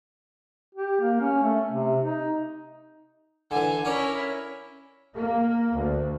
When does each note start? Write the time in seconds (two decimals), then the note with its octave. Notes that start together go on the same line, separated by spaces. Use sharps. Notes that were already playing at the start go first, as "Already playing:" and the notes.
0.75 G4
1.01 A#3
1.21 C#4
1.43 A3
1.71 C3
2.00 D#4
3.51 D3 E3 G#5
3.85 C#4 E4 A#4 C#5 D5
5.14 A#3
5.74 D2